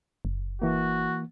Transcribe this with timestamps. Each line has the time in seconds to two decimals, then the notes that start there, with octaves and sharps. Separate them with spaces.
0.25 F#1
0.62 E3 A#3 F#4